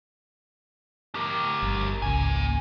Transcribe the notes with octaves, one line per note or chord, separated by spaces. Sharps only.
G4 A#4
G1
G#1 C#2 A#3 G#5